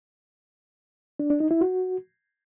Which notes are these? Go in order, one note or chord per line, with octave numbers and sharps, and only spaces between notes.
D4
D4
D#4
E4
F#4